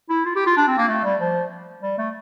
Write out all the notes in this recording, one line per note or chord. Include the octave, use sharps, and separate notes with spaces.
E4
F4
G4
F4
D4
C4
A#3
A3
G3
F3
G3
A3